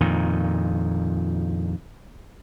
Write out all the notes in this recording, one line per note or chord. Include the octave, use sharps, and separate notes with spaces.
F2 A#2 D#3